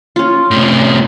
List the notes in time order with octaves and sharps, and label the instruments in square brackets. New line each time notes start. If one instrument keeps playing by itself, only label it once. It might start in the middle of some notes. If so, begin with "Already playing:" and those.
[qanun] C#4 F4
[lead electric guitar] A2 C3